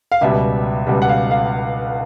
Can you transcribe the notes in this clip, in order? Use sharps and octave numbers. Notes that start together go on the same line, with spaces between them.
F5
C#2 B2 G3 E5
C#2 B2 G3
F#5
F5
F5